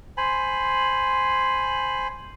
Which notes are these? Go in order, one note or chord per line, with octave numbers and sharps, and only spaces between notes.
C5 G#5 B5